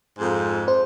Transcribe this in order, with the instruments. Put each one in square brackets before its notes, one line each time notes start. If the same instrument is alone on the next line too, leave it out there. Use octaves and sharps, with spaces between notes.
[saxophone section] F2 G#2
[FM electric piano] C5